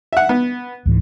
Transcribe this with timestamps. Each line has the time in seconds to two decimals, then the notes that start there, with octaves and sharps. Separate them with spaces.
0.13 E5 F#5
0.29 B3
0.86 C#2 G#2 E3